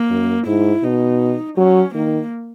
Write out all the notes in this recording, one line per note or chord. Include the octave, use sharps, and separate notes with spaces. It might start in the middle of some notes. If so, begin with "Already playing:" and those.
Already playing: A#3
F#2
G#2 E4
B2 D#4
F#3 C#4
D#3 A#3